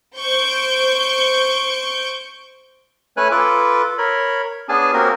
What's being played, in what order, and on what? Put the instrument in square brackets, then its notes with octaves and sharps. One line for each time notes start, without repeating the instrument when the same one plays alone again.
[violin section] C5 C#6 G6 D7
[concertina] A3 C#4 B4 C#5 G#5 F#6
F4 A4 B4 D6
A#4 C#5 B5
B3 C#4 D4 G#4 G#5 A5
A#3 C4 C#4 F#4 G4 A#4